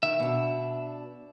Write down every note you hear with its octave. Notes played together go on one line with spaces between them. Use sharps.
D#3 E5
B2 D4